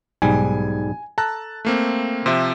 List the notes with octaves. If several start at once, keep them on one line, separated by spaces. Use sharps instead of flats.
B1 G#2 G3 G#5
A4 A5 A#5 F#6
A3 A#3 C4
C3 F3 C5 E5